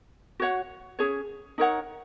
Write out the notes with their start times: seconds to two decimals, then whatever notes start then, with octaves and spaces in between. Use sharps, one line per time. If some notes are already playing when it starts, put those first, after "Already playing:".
0.40 F#4 C#5 F#5
0.99 C#4 G#4 C#5
1.58 D#4 A#4 C#5 F#5